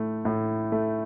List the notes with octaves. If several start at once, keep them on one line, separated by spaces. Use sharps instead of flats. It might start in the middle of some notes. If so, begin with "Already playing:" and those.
Already playing: A2 A3
A2
A3